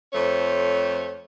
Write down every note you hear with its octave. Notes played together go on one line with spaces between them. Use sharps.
F2 A3 C5 C#5